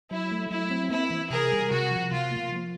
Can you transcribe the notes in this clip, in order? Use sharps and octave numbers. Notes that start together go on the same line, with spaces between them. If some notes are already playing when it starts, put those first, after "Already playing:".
F#3 E4
A3
F#3 E4
C4
A#3 E4
E3
C3 G#4 A#4
G3
C3 F#4
F3
C3 F4
A#3
F3